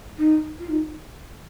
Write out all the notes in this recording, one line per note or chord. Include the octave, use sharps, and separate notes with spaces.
D#4
F4
D#4